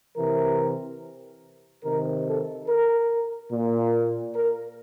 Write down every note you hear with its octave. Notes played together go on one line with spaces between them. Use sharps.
C3 E3 A#4
C3 D#3 A#4
A4
A#4
A#2
A#4